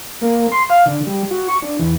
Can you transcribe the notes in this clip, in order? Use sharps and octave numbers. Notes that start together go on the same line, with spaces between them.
A#3
C6
F5
D3
G3
F#4
C#6
D4
E2